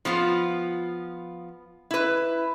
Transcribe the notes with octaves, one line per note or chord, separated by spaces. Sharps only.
F3 B3 F4
E4 B4